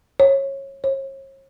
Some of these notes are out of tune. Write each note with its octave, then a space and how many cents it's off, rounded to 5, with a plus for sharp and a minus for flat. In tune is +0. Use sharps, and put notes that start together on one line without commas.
C#5 -20
C#5 -40